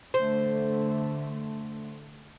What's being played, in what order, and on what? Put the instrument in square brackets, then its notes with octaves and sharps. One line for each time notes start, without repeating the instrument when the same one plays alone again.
[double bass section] D3 A3 [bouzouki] C5